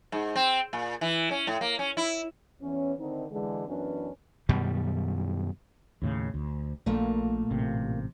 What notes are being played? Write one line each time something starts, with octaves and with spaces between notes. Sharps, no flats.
G#2
C4
A#2
E3
C#4
A2
A#3
C#4
E4
E2 E3 C#4
D3 D#3 C4 D#4
D3 E3 G#3
F#2 E3 B3 C#4 D4
F#2 B2 D#3 G3
D#2 A2 C#3
D2
A#1 A#2 A3 A#3
A1 C3